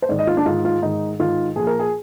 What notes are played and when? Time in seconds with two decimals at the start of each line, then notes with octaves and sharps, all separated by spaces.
0.02 C5
0.09 G#2 D#3 D5
0.19 D#5
0.27 F4
0.37 D4
0.46 G#2 D#3 F4
0.65 F4
0.82 G#2 D#3 D#4
1.19 G#2 D#3 F4
1.56 A#2 F3 G#4
1.67 A#4
1.79 G#4